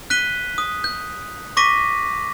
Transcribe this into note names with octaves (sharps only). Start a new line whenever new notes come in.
F#6 B6 D#7 G7
D#6
G6
C#6 D6 A#6 B6 D#7